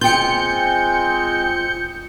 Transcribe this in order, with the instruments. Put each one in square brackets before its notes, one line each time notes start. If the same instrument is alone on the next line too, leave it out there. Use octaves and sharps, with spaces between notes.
[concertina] G#3 C4 [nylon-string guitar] F4 G5 [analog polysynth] G6 C#7